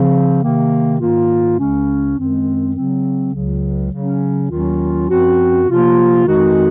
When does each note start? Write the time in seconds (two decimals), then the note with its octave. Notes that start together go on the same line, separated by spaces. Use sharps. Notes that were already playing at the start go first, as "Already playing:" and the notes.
Already playing: C#3 F3 C4
0.43 C3 D#3 A#3
1.01 G#2 D#3 A#3 F4
1.59 C#2 C#3 G#3 C#4
2.17 F#2 D#3 G#3 C4
2.76 C#3 F#3 C4
3.34 C#2 C#3 F#3
3.93 C#3 F#3 C#4
4.50 D#2 D#3 F#3 C#4 F4
5.09 F#2 F3 C4 F#4
5.67 C3 F3 A#3 F4
6.26 F2 D#3 G#3 D#4 F#4